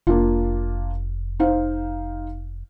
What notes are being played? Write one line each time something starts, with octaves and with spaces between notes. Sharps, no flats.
F1 A#3 D4 F4
D#4 C5 F5